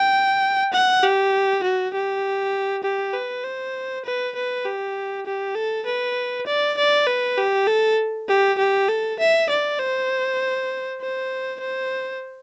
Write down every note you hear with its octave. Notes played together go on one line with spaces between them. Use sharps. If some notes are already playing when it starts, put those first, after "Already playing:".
Already playing: G5
F#5
G4
F#4
G4
G4
B4
C5
B4
B4
G4
G4
A4
B4
D5
D5
B4
G4
A4
G4
G4
A4
E5
D5
C5
C5
C5